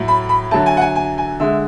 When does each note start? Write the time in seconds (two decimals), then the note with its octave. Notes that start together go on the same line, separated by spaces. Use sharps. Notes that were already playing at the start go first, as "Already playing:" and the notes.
Already playing: A2 F#3 A3
0.08 B5
0.29 B5
0.51 D3 F#3 A3 A5
0.66 G#5
0.77 F#5
0.81 G#5
0.96 G#5
1.18 G#5
1.40 D3 G#3 E5